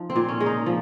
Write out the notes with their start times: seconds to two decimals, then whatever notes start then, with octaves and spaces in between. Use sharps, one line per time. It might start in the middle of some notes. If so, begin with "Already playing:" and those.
Already playing: F3 D#4
0.10 C4
0.16 A#2
0.29 C#4
0.40 G#3
0.46 D#4
0.66 F3